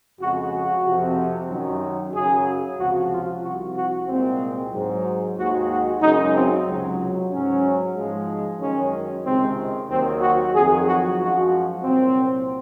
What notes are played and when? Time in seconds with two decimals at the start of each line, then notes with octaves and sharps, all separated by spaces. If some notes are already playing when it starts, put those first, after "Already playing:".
0.20 F2 C#3 G#3 F#4
0.52 F#4
0.85 F2 C3 F3
1.50 F#2 D#3 F#3
2.14 F#2 C#3 F#3 G#4
2.79 C#2 C3 F3 F#4
3.11 F4
3.43 C2 C3 F3 F#4
3.76 F#4
4.08 C2 A#2 G#3 C4
4.72 G#2 F#3
5.37 D#2 D#3 G#3 F#4
5.70 F#4
6.02 F#2 C#3 G#3 D#4
6.35 C4
6.66 C#2 C3 F#3
7.31 G#2 F#3 C#4
7.95 G#2 F3 G#3
8.60 F#2 D#3 G#3 C#4
9.25 C#2 C3 D#3 G#3 C4
9.89 D#2 D#3 F#3 C4
10.22 F#4
10.54 F2 D#3 F#3 G#4
10.86 F#4
11.19 F#2 F3 G#3 F#4
11.83 C2 A#2 F#3 C4